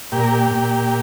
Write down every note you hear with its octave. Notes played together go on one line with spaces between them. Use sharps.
A#2 G4
A#4
G4
A#2